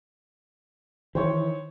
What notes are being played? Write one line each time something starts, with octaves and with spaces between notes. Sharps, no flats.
D#3 E3 C5 C#5 C#6